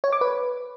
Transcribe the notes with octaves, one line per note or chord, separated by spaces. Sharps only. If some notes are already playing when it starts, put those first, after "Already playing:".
C#5
D6
B4